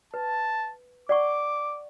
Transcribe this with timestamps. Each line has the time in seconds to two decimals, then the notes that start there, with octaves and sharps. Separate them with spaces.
0.14 B4 A5
1.09 D5 F#5 C#6 D6